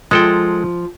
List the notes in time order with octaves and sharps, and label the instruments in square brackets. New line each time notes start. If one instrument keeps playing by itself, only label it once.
[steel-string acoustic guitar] F3 [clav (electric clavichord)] G#3 A4 G5